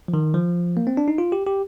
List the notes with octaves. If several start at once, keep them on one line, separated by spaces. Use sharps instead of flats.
F3
D#3
F3
A#3
C4
D4
D#4
F4
G4
G4